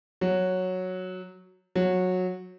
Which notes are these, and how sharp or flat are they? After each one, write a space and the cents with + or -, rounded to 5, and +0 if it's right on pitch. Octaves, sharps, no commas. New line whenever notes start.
F#3 -5
F#3 -15